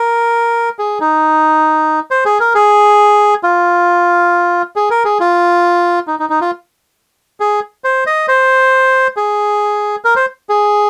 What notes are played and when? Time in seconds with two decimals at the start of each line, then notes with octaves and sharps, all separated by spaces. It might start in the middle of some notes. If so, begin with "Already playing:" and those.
Already playing: A#4
0.79 G#4
1.00 D#4
2.11 C5
2.25 G#4
2.40 A#4
2.55 G#4
3.43 F4
4.76 G#4
4.90 A#4
5.05 G#4
5.20 F4
6.07 D#4
6.19 D#4
6.30 D#4
6.41 F4
7.40 G#4
7.84 C5
8.06 D#5
8.28 C5
9.16 G#4
10.04 A#4
10.16 C5
10.49 G#4